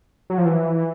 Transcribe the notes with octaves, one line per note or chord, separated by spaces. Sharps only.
F#3
F3
E3